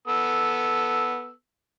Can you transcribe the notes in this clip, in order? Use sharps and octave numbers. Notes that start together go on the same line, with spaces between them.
B3 A4 E6